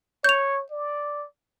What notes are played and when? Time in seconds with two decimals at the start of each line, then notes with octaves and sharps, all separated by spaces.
0.24 C#5 G6 F7
0.71 D5